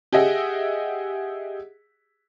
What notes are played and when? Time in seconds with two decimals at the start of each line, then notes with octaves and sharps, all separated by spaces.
0.13 G4 G#4 D#5 E5 F#5